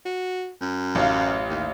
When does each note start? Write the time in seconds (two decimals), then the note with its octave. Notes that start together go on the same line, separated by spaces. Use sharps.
0.05 F#4
0.61 F#2
0.95 A1 F5
1.49 D#2